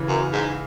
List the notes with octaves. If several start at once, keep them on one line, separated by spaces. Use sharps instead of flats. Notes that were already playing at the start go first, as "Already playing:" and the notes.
Already playing: C#3 E3
F#2
G#2